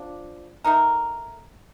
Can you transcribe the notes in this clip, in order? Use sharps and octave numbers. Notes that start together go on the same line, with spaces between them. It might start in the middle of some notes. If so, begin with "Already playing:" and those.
Already playing: F3 D4
A3 D#4 A#4